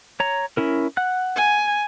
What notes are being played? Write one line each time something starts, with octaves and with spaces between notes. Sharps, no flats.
C#5 A#5
C#4 E4 A#4
F#5 F#6
G#5